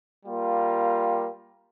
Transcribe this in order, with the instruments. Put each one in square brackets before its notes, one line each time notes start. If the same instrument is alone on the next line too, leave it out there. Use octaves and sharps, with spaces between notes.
[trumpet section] G3 A#3 F4